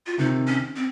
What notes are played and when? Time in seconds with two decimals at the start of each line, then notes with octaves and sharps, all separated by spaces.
0.06 F4
0.18 C3 D#3 D#4
0.47 C#4
0.76 C4